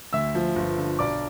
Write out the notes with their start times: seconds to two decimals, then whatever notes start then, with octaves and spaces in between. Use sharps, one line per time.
0.13 D2 E5 E6
0.35 F3
0.56 G1
0.78 D3
0.99 B1 D5 D6